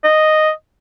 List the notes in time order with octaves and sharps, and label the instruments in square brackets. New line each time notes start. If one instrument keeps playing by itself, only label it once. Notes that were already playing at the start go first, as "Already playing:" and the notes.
[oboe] D#5